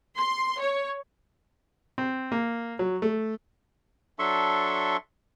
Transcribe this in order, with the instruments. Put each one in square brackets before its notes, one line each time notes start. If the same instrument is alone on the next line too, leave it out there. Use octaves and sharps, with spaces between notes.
[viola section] C6
C#5
[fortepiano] C4
A#3
F#3
A3
[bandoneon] F#3 D4 A4 E5 C6 C#6